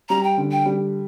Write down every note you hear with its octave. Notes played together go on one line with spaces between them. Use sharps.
G3 A#5
G5
D3
G5
G3